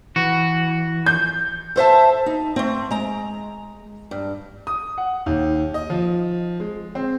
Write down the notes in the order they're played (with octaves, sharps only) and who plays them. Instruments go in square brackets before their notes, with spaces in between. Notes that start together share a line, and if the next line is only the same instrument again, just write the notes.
[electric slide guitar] E3 [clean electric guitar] F#4
[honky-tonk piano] G6
[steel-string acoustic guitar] A4 C5 E5 A5
D#4
A3 C4
G#3 A#5
G2
[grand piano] D#6
F#5
D#2
D#5
F3
G#3
C4